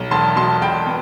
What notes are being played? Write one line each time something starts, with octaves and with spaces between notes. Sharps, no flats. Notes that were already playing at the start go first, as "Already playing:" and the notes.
Already playing: B1
E1 A5 C6
B2 A5 C6
E1 G5 B5
B3